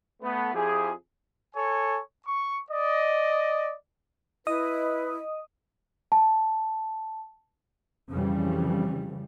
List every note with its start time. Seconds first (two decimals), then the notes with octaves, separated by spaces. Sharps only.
0.22 A3 B3
0.54 F2 F3 E4 G4 G#4
1.55 A4 C#5 G#5
2.26 C#6
2.70 D5 D#5
4.47 E4 B4 D#5 D#6
6.12 A5
8.10 F2 C#3 E3 F3 G3